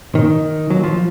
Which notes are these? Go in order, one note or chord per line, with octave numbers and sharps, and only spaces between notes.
D#3
F#3
F3